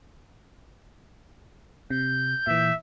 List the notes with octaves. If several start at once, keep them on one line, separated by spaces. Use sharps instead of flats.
C3 G6
A#2 E3 E5